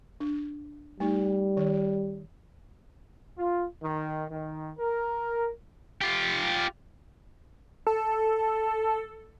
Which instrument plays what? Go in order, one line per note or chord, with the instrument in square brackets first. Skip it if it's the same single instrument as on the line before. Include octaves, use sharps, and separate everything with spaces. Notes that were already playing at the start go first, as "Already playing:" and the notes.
[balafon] D4
[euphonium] G3 [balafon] A3 D#4
[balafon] D#3
[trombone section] F4
D#3
D#3
A#4
[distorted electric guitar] F4 G4
[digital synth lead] A4 [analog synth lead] A5